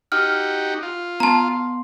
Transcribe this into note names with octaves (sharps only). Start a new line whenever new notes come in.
D#4 F#4 G4 F6
F4
B3 A5 A#5 C6